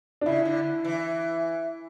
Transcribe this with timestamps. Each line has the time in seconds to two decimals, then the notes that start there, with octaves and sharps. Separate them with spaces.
0.21 D4
0.26 C#3 E4
0.45 D3
0.84 E3